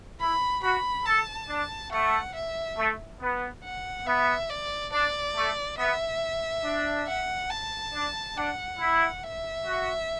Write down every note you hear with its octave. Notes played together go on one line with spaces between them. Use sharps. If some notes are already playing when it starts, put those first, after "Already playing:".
E4 B5
F#4 B5
A4 A5
D4
A3 F#5
E5
A3
B3
F#5
B3 E5
D5
D4 D5
A3
B3 E5
D4
F#5
A5
D4
D4 F#5
E4
E5
F#4